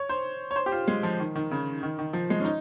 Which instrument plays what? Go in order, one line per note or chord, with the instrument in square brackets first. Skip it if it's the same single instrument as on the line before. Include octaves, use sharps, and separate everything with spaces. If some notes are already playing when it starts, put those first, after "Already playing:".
Already playing: [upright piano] C#5
C5
C#5
C5
G4
F4
G#3
F3
D#3
D#3
C#3
D#3
D#3
F3
G#3
C#4
D#4